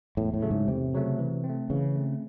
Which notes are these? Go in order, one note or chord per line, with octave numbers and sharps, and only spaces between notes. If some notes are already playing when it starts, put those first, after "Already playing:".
E2 A2
A2
C#3 F#3 A3
G#2
E2 C3
C#3 F#3 A3
E3
C4
A3
C#3 E3
A3 C4